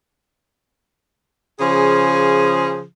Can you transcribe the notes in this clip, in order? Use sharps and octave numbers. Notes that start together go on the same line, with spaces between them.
C#3 F3 G#4